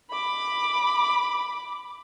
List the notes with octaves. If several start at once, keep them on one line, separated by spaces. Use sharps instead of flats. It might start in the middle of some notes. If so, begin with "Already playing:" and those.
B5 D6